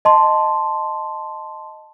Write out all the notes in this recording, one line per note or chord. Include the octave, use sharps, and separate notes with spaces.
D#5 A5 C6